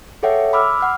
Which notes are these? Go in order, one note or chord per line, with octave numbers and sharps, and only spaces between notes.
G#4 A4 C#5 E5 F#5 G5
B5 D6 E6 F6
F#5 F6